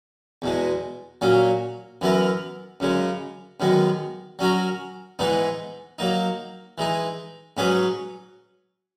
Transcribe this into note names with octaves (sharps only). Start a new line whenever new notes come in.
E2 B2 G#3
A#2 F#3 C#4
F#2 E3 B3 E4 A#4
F#2 C#3 G#3
F#2 D#3 G#3 B3
F#3 C#4 F#4 A#4
G#2 E3 G#3 B3 D#4
F#3 A#3 D#4
E3 G#3 D#4
G#2 F#3 C#4 G#4 B4